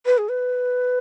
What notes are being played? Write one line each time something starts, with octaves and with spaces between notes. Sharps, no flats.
B4
G#4
B4